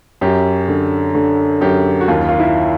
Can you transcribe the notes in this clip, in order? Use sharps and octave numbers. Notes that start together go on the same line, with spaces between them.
F#2 G4
D3
D3
F#2 G4
F#4
D#2 F4
F4
E4